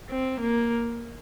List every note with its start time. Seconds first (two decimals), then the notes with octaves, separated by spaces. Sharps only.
0.10 C4
0.40 A#3